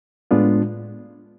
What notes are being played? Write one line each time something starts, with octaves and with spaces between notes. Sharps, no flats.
A2 G#3 B3 D4 F4